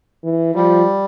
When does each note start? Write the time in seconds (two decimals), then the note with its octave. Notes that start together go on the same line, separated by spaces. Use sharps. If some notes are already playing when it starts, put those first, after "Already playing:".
0.23 E3
0.54 F3 G3